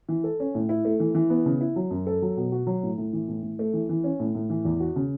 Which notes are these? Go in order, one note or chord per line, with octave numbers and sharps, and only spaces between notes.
E3
A4
C#4
A2
E4
A3
E3
E3
B3
C#3
E4
F#3
F#2
A4
F#3
B2
F#4
F#3
A2
A2
E3
A2
A2
A3
E3
E3
C#4
A2
A2
E3
E2
F#4
C#3